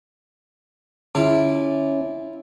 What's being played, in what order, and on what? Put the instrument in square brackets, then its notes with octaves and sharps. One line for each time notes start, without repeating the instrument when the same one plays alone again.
[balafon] D3 [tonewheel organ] C#4 [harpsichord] E4 F4 D5